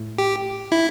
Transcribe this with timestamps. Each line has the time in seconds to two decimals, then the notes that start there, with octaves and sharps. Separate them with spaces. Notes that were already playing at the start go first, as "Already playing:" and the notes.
Already playing: A2 A3 E4
0.18 G4
0.72 E4